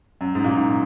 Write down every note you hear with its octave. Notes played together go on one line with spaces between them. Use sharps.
F#2
G#2
A#2
G#2